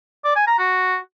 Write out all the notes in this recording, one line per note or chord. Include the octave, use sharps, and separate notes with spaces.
D5
G#5
A#5
F#4